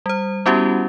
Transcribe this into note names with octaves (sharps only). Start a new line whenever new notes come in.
G3 C5
G3 B3 C#4 E4 F#4 G4